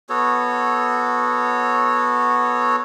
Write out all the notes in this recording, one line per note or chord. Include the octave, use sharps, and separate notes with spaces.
B3 F#4 A4 C#5